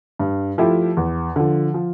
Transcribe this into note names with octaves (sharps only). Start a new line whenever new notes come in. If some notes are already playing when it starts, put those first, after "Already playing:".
G2
F3 A3 E4 G4
E2
D3 F3
F3